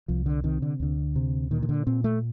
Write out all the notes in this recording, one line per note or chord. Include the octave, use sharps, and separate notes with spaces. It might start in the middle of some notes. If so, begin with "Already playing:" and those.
C2 F3
D3
C3 D#3
D3
D2 D3
C3
A#2 D#3
D#3
D3
A#2 C4
A3